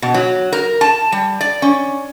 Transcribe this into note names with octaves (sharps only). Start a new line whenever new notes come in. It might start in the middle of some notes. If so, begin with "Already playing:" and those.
B2
F#3
A#4
A5
G3
D5
C#4